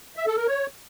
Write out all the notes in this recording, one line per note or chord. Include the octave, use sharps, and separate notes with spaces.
E5
A4
A#4
C#5